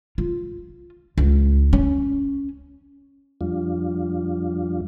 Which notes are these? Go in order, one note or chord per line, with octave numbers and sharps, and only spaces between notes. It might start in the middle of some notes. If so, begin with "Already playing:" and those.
F4
C#2
C#4
F2 F3 G3 D4 F4